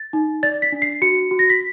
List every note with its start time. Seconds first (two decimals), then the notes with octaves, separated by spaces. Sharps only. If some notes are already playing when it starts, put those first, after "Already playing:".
Already playing: A6
0.13 D#4
0.43 D5 A6
0.62 B6
0.72 D4
0.82 C7
1.02 F#4 C#7
1.31 F#4
1.39 A#6
1.50 B6